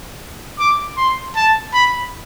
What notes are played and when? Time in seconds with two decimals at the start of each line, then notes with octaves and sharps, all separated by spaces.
0.59 D6
0.97 C6
1.36 A5
1.74 B5